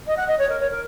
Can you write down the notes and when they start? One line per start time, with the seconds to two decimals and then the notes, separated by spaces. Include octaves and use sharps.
0.07 D#5
0.17 F#5
0.28 D#5
0.39 C#5
0.49 A#4
0.60 C#5
0.71 A#4